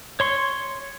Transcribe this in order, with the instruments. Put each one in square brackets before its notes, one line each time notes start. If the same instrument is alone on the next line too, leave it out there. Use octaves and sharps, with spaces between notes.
[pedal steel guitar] C#5 C6 C#6